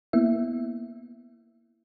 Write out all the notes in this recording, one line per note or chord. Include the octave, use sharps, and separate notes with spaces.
A#3 B3 E4 E5